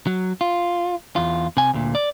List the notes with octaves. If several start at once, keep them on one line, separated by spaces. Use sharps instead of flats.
F#3
F4
E2 F4
C3 G#5
D2 A#2
D5